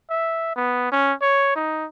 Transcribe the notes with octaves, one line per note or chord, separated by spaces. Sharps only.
E5
B3
C#4
C#5
D#4